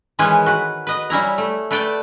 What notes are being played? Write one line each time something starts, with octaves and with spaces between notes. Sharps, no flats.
D#3 E3 G#3 C#4 B4 G#5
F#4 B4
B4 D#5
G3 C#4 E4 A#5
A3
A3 B4 D5 G5 A5